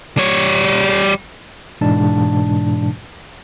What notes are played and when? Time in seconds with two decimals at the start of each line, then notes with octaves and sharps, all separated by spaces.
0.18 G3 C#5
1.81 G#2 B2 E3 G#3 D4 A5